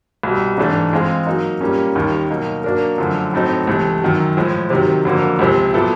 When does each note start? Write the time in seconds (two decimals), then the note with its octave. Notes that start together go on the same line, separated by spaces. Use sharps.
0.23 C2 B2 G3
0.58 G#2 E3 A3 D4
0.92 E3 G#3 C4 F4 G#4
1.27 F#3 A#3 D#4
1.61 A#2 G3 A#3 C#4
1.95 D#2 D#3 G3
2.30 B2 F#3 A#3 D#4
2.64 F#3 A#3 D4 F#4 A#4
2.98 F#2 D3 F3 A3
3.33 A2 F#3 A3 C4 D#4
3.67 C#2 C3 E3 A3
4.02 F#2 D#3 F#3
4.37 A2 F3 G#3
4.70 C3 D#3 F#3
5.05 F2 D3 F#3 A#3
5.39 C#2 C3 F3
5.74 A#2 F#3 B3 E4 A4